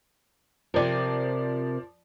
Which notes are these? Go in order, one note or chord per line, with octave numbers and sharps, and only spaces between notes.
C3 F3 A#4 D5